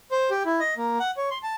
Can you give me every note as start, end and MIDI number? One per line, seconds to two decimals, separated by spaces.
0.12 0.30 72
0.31 0.43 67
0.46 0.60 64
0.60 0.74 75
0.78 0.98 58
1.00 1.11 78
1.17 1.29 73
1.31 1.38 84
1.43 1.56 81